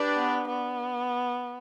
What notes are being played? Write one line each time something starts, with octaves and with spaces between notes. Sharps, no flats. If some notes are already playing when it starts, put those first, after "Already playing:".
Already playing: D4 G4 B4 D5
B3
B3